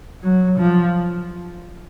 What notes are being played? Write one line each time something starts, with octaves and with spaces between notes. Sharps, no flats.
F#3
F3